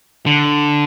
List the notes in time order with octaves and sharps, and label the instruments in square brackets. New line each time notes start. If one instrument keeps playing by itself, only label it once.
[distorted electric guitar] D3